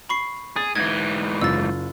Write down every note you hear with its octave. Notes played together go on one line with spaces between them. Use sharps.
B5 C#6 C7
G#4 A6
G#2 E3 G#6
F#1 F4 E6 A6